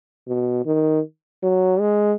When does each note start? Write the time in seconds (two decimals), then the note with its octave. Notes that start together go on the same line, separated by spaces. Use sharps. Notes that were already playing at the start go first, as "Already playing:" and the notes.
0.27 B2
0.66 D#3
1.43 F#3
1.80 G#3